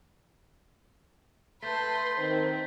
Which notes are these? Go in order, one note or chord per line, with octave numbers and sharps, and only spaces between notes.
A3 B4 C6 G6 A6 B6
D#3 C4 C5